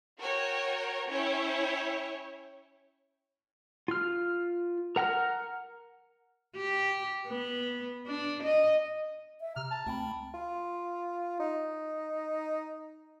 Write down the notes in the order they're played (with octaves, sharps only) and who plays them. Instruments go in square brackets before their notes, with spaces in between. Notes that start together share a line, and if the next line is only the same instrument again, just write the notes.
[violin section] F#4 A#4 C#5 G5
C#4 E4 C#5 G5
[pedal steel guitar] F4 F6
A#4 F#5 A#5 F6
[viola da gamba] G4
B3
D4
D#5
[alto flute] E5
[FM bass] C3 [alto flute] A#5 [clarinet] F6
[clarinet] A5
[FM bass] D2 [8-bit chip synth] A3 G5 B5 [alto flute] C4
[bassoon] F4
D#4